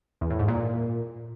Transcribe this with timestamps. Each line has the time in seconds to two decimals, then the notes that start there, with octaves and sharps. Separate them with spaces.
0.21 E2
0.30 A2
0.39 G#2
0.48 A#2